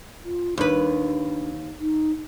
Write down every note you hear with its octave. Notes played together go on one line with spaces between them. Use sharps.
F4
D#2 D4 B4
D#4